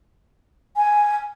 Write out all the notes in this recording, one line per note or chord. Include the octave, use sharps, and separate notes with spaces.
G#5